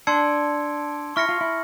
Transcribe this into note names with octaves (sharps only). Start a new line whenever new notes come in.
D4 A5 C6 E6 G#6 C#7
E4 C#6 F6 A#6 C#7
F4
E4